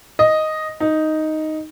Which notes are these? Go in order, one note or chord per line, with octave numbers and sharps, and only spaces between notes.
D#5
D#4